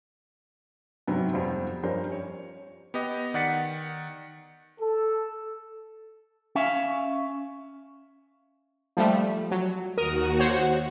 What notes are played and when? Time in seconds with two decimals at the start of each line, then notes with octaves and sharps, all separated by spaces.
1.07 G#2 C3 F#3 B3
1.33 F2 F3 G3 B3 C4
1.83 G2 F3 G3 C#4 A#4 C5
2.12 C#5
2.94 B3 G4 D#5
3.34 D#3 D5 F#5 A6 B6 C#7
4.81 A4
6.55 C#4 E5 F5
8.97 F3 G3 A3
9.51 F#3
9.98 D#2 F#4 A#4 D#6
10.39 C5 C#5 F#5